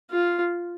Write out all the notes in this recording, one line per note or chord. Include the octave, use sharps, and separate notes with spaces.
F4